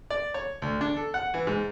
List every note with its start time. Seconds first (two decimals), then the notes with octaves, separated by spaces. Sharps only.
0.10 D5
0.34 C#5
0.62 D2
0.81 D4
0.97 A4
1.14 F#5
1.34 E3
1.47 G#2